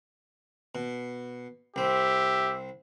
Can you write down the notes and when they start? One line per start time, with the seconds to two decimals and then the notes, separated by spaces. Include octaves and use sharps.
0.75 B2
1.76 C2 C4 G4 E5